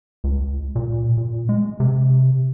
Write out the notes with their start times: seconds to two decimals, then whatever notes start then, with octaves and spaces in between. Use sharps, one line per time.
0.24 C#2
0.75 A#2
1.17 A#2
1.49 G#3
1.80 C3